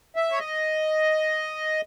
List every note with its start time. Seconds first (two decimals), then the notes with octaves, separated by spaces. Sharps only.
0.16 E5
0.32 C#5
0.39 D#5